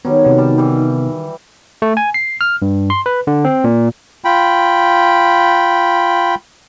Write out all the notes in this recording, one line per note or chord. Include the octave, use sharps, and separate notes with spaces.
D#3 F#3 G3 B3
C3 B3
G3 A5
E3 G3
A3
G#5
C7
F6
G2
C6
B4
D3
C4
A#2
F4 G5 B5